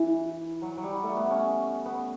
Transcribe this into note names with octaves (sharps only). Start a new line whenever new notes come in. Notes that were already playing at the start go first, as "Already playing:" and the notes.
Already playing: E3
F#3
F#3
G3
A3
B3
C#4
B3